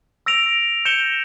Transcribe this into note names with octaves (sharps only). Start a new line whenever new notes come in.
E6 A#6 D7 F7
G6 A#6 C#7 E7 G7